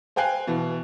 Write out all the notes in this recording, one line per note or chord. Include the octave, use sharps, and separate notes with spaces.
C5 F5 G5 G#5 F#6 C7
B2 E3